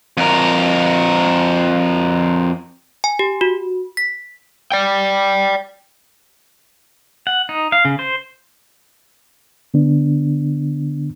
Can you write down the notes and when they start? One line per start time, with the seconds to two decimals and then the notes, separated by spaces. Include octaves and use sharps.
0.17 F2 A#4
3.04 G#5
3.19 G4
3.41 F#4
3.97 B6
4.72 D5 G5
7.27 F#5
7.49 D#4
7.72 F5
7.85 C#3
7.99 C5
9.74 D3 B3 D4